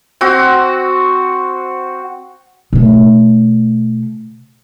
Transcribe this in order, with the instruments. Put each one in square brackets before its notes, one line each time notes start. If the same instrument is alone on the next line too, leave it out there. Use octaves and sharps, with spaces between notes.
[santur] C4 F#4
[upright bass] B2 A3